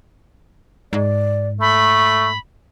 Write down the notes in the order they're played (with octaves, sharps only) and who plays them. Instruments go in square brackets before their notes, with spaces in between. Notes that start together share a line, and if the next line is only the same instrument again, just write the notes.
[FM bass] G#2 [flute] D5
[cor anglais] A3 [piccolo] B5 [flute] C#6